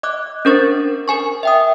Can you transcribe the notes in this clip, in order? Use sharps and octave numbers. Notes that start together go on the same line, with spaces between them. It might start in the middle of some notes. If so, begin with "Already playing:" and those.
D#5 D6 F#6
C#4 D4 A#4 C5 C#6 A6
A#4 G#5 C#6
E5 G5 D#6